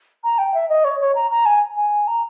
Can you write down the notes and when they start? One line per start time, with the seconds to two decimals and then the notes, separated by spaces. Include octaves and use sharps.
0.24 A#5
0.38 G5
0.54 E5
0.69 D#5
0.84 C#5
1.00 C#5
1.15 A#5
1.31 A#5
1.46 G#5
1.77 G#5
2.07 A#5